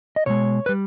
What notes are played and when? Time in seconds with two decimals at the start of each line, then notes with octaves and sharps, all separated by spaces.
0.16 D#5
0.26 B2 G#3 C#5
0.66 B4
0.69 G3